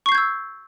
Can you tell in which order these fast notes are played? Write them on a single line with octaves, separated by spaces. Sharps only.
C#6 C7 G6 G#6 E6